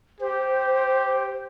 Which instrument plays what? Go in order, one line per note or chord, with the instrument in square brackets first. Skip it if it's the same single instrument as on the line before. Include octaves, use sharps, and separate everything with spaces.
[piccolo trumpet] G4 [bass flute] C5